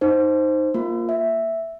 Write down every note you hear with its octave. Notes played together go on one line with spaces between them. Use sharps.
D#4 C5
A#3 F4
E5